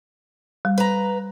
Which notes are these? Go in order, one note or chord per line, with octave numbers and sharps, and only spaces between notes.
G3
B4 A#5